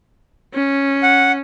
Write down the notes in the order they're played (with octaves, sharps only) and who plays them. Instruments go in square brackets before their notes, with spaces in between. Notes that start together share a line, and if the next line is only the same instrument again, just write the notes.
[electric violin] C#4
[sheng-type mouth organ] F#5